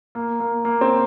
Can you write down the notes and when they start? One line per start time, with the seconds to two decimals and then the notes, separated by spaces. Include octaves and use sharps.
0.15 A#3
0.40 A#3
0.65 A#3
0.81 C4